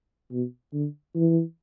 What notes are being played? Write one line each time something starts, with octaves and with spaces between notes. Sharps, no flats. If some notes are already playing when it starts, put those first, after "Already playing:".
B2
D3
E3